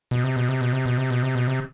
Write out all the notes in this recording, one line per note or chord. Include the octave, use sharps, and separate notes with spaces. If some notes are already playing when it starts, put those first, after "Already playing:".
B2
C3
B2
C3
B2
C3
B2
C3
B2
C3
B2
C3